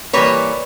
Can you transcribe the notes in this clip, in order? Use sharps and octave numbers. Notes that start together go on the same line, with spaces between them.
E3 G3 A#3 B4 C#5